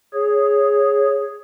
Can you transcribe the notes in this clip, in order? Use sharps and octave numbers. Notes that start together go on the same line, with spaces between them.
G#4 C#5